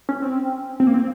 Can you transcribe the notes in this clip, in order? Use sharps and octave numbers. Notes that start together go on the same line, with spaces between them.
C#4
C4
C4
A#3
C4